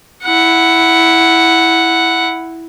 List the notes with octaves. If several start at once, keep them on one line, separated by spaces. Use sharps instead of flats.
E4 F#5